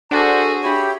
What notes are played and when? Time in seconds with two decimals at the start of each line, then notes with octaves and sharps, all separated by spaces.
0.11 D4 F#4 G#4 A4 C5 F#5 A5
0.62 G4 C#5 E5 B5